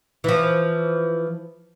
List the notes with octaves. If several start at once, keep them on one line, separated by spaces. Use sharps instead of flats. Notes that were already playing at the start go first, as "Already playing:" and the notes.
E3 F3